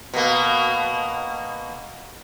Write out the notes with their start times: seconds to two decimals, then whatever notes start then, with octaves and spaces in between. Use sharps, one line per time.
0.14 B2 A#3